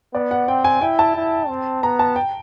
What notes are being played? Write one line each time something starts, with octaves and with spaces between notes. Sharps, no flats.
B3 D5
F#5
C4 G5
G#5
E4 G5
A5
E4
C4
B3 A#5
A5
G5